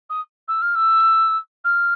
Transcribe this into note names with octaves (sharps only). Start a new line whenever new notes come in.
D#6
E6
F6
E6
F6